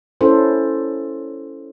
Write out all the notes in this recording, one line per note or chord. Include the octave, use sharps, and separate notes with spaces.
C#4 E4 A4 C5